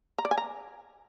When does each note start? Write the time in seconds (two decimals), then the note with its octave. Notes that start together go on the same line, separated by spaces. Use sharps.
0.18 A#5
0.25 D5
0.31 G#5
0.38 A#5